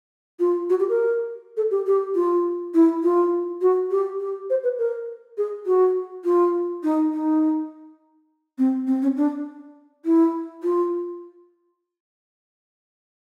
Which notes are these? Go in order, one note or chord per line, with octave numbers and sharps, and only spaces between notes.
F4
F#4
G4
A#4
A4
G4
G4
F4
E4
F4
F#4
G4
G4
C5
B4
A#4
G#4
F#4
F4
D#4
D#4
C4
C4
C#4
D4
E4
F4